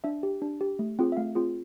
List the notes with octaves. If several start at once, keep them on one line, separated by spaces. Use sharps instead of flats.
D4 E5
G4
D4
G4
A3
C4 F4 G#4
E5
A3 F5
C4 F4 G#4